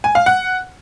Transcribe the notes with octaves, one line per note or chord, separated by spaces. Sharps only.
G#5
F5
F#5